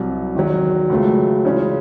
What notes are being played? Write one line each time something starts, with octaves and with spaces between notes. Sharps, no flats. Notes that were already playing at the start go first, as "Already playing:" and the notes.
Already playing: C2 C3 F#3
E2 D#3 F#3
C#2 C#3 F#3 A3
C#3 E3 G#3 C#4